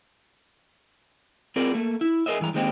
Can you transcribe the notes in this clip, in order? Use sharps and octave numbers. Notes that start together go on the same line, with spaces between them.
C4 F4 G#4 A#4 D5
A3 A#3
E4
G#4 A#4 C5 D#5 E5
G2 E3 G#3 A#5
D#3 G#3 A#3 C4 D#4 G4